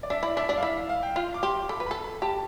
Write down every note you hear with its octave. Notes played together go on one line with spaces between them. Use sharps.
D5
D4 E5
E4 D5
D4 E5
D4 D5
F5
E4 E5
F5
F5
G5
F4 F6
D6
G4 C6
D6
A4 B5
B4
A4 B5
B5
G4 A5